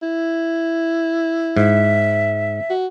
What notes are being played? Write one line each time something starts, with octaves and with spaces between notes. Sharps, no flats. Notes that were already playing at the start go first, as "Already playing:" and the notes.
E4
G#2 E5
F#4